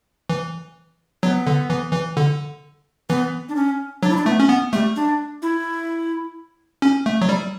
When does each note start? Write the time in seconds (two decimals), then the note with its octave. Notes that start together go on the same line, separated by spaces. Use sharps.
0.30 E3
1.23 F#3 B3
1.47 D3
1.70 E3
1.93 E3
2.17 D3
3.09 E3 B3
3.49 D4
3.56 C#4
4.03 F#3 D4
4.10 E4
4.17 D4
4.26 A3 B3
4.40 C#4
4.49 B3
4.73 G3 A3
4.96 D4
5.42 E4
6.82 C#4
7.06 A3
7.21 F#3
7.29 G3